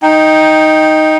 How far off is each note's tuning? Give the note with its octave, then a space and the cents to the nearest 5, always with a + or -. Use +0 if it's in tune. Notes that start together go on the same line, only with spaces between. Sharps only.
D#4 +0 G5 +0